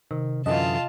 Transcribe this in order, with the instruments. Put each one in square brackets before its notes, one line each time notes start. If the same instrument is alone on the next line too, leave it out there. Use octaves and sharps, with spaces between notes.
[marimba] C3 [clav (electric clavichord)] D#3
[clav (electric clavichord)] F#2 D3 E3 [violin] F4 A5 [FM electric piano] D#5